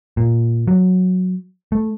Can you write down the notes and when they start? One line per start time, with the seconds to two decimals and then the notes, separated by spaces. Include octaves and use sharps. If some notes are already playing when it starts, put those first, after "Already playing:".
0.17 A#2
0.68 F#3
1.72 A3